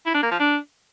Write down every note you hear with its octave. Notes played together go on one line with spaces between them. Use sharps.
E4
D4
A#3
F3
D4